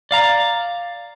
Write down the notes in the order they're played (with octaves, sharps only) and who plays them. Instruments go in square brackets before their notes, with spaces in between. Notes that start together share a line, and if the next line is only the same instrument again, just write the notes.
[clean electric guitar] D5 F5 A#5